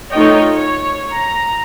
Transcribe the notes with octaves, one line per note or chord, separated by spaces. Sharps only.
A3 D#4 F4 C#5 D#5 G5
C#5
A#5